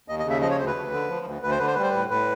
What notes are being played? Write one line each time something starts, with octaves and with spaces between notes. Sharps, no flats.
D#2 D#5
D#5
C#3
E5
F3 D#5
C#5
D2 C5
B4
D2
D3
F3
D2
D2 B4
C5
D3 B4
C5
G3 B4
C5
A2 B4
A2 B4